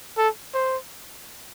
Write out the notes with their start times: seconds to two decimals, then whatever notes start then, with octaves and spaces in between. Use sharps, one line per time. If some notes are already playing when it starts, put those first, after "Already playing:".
0.17 A4
0.54 C5